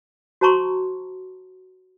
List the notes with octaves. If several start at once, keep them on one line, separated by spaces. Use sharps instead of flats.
F#4 C5 A5 A#5 C6 C#6